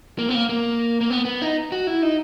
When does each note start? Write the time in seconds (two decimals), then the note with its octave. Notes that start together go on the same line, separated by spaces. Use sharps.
0.19 A#3
0.29 B3
0.34 A#3
0.49 A#3
1.01 A#3
1.10 B3
1.25 B3
1.42 D#4
1.72 F#4
1.87 E4
2.02 D#4